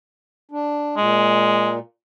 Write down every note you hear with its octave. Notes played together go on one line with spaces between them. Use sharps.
D4
A#2 G#3